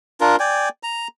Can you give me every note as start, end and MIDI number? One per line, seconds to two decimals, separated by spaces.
0.21 0.36 62
0.21 0.36 65
0.21 0.36 70
0.40 0.69 74
0.40 0.69 79
0.40 0.69 80
0.83 1.08 82